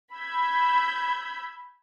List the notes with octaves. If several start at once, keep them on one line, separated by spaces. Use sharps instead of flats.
B5 E6 G6 G#6